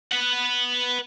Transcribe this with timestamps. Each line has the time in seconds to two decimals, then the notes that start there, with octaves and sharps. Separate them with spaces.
0.12 B4 F#5